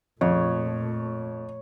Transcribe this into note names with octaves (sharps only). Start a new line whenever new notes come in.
F2 A#2 A3 C#5